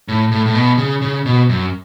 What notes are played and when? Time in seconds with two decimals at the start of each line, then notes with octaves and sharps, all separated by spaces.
0.08 A2
0.31 A2
0.46 A2
0.55 B2
0.78 C#3
1.02 C#3
1.26 B2
1.49 F#2